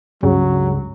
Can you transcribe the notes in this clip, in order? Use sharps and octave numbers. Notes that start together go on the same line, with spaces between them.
C#2 G2 C#3 F#3